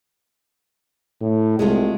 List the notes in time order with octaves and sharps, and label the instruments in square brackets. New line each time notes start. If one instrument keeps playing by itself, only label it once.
[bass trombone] A2
[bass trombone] C2 [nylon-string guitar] G#3 A3 F4